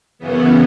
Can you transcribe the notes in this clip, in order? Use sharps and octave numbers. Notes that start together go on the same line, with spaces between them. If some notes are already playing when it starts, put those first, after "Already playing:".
F#2 C#3 E3 B3